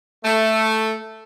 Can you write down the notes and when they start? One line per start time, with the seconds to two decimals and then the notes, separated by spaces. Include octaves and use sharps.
0.24 A3